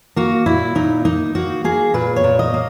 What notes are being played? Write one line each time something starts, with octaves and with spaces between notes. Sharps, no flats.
A#3 F#4
A#2 E4
A#2 D#4
A#3 D#4
A#3 F#4
A#3 G#4
A#2 B4
C#5
A#2
D#5
A#3